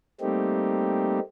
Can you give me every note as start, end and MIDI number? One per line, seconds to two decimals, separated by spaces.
0.21 1.20 55
0.21 1.20 57
0.21 1.20 58
0.21 1.20 60
0.21 1.20 63
0.21 1.20 67